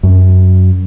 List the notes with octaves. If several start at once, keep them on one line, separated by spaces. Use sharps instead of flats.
F#2